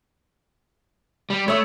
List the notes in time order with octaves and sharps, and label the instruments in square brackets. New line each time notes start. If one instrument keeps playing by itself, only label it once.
[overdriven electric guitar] G3
[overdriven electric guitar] A3 [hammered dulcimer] C#5 E5